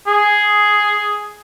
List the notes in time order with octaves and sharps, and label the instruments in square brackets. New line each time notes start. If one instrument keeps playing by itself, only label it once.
[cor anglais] G#4